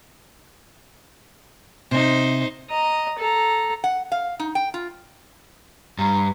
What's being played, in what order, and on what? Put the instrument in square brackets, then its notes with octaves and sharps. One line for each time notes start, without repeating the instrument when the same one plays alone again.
[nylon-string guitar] C3 [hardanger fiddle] D#4 C5
[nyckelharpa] D#5 A#5
A4 A#5
[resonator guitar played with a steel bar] F#5
F5
D#4
G5
F4
[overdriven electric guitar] G2 [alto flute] A#5